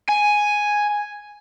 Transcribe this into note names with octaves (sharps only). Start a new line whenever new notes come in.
G#5